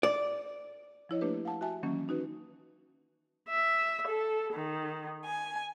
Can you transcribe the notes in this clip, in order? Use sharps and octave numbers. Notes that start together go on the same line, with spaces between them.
D5
F3 E4 C#5 D#5
A3 A#3 D4 G4 B4
F5 F#5 A5
F#4 E5 G#5 A5
D#3 E3 F#3 A#3 C#4
C#4 D#4 F#4 B4
E5
A4
D#3
G#5